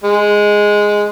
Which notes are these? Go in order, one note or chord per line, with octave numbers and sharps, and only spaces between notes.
G#3